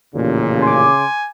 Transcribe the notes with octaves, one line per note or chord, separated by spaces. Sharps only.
A1 D#2 A#2 C#3
G#5 C6 D6